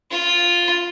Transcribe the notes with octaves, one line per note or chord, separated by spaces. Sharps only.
F4